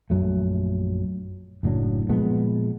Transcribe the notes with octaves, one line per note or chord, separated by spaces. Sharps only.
A#1 F#2 F#3 A3
F#1 A2 F#3 D4
A#2 F3 G#3 B3